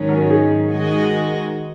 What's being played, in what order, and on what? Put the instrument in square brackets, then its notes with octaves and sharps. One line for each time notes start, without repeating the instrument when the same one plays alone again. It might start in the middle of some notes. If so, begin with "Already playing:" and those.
Already playing: [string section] G#2 D#3 F#3 C#4
[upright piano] F#4 A#4
D#4 G#4
[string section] D#3 G#3 F#4 D#5